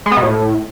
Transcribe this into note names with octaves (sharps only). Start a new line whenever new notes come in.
G#3
B3
B2
A2